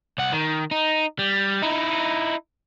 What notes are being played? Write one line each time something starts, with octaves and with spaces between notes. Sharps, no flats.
C2 F#5
D#3
D#4
G3
D#4 E4